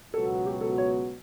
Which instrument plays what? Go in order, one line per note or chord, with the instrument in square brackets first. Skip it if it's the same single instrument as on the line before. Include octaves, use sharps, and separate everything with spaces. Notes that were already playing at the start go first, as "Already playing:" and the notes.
[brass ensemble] C#2 B2 F#3 B3 F#4 [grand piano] A4
[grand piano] G4
A4
C#5